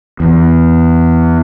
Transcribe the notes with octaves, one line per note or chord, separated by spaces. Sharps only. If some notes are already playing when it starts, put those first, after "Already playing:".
E2